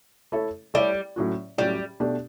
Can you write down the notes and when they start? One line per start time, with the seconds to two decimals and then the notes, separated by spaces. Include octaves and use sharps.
0.32 A3 E4 A4 C#5 E5
0.74 G3 A3 E4 A4 C#5 E5
1.16 A2 F#3 C#4 F#4
1.58 A2 F#3 G3 C#4 F#4
2.00 B2 A3 D4 G4 D5